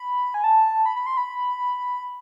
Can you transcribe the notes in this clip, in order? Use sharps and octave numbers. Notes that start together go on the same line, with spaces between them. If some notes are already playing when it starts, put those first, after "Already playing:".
Already playing: B5
G#5
A5
B5
B5
C6
B5